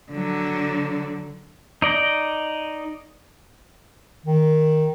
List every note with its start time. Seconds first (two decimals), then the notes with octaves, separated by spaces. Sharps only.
0.12 D3 F#3
1.82 D#4 D5 D#5
4.26 D#3